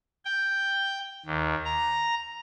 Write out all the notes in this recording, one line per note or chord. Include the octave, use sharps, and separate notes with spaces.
G5
D#2
A#5